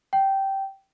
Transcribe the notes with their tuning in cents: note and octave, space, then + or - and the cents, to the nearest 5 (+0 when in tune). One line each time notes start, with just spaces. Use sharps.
G5 -10